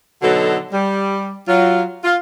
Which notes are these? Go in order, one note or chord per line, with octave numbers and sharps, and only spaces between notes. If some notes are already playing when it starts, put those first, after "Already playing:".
B2 D3 F#3 D#4 F#4 A4
G3
F#3 F4
F4